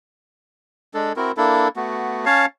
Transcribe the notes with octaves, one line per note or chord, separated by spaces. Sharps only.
G#3 D4 A4
C4 E4 F#4 A#4
A#3 D4 E4 A4
A3 B3 F#4
C#4 C#5 F5 A5